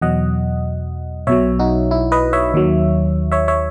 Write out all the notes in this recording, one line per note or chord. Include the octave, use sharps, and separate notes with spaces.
E2 B2 F#3 D#5 F#5
B1 B2 F#3 C#5 E5
D#4 F#4
E4
B4 D#5
C#5 E5
D#2 D#3 F#3
C#5 E5
C#5 E5